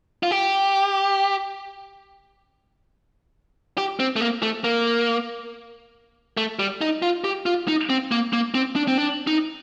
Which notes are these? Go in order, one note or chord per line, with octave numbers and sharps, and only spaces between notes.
F4
G4
G4
C4
A3
A#3
A3
A#3
A3
G3
D#4
F4
G4
F4
D#4
C4
A#3
A#3
C4
D4
C4
D4
D#4